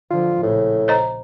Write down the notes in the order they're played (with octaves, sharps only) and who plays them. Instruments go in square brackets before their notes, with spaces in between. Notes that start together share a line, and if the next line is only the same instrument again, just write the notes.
[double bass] D3 F3 [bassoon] F4
[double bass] A#1 C#3 [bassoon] A2
[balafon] C5 D#5 A#5